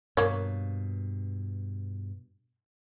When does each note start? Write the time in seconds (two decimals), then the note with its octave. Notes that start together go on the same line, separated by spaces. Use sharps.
0.17 G2 B2 A#3 C#5